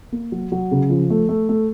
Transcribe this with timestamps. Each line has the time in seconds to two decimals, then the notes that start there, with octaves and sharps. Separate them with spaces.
0.12 A#3
0.32 F#3
0.52 F#3
0.71 C#3
0.90 F3
1.10 A3
1.29 A3
1.49 A3